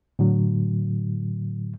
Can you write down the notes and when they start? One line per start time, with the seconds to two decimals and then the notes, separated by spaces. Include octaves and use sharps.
0.19 A2 D3 F#3